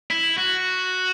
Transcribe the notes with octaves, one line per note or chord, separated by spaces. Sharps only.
E4
F#4